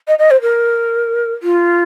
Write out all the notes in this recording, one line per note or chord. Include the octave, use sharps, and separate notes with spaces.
D#5
D#5
C5
A#4
F4